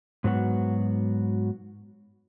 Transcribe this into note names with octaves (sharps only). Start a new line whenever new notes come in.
G#2 F#3 B3 F#4